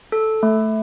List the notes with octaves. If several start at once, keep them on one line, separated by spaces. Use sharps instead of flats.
A4
A3